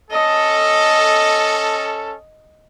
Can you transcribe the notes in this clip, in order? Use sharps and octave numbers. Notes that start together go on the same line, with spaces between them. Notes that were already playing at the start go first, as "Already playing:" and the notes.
C#4 A4 D#5